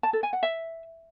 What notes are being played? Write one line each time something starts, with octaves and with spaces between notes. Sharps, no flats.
A5
A4
G#5
F#5
E5